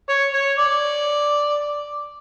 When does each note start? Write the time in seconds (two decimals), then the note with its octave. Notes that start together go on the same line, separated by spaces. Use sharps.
0.09 C#5
0.33 C#5
0.59 D5